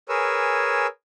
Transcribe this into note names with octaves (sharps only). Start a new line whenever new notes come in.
G#4 A#4 B4 C#5 G#5 E6